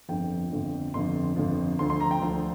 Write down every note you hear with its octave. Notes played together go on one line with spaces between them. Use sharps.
G1 F2 D3 F3 G5
G1 F2 D3 F3
G1 F2 D3 F3 C6
G1 F2 D3 F3
D2 D3 F3 C6
C6
A#5
G5
D2 D3 F3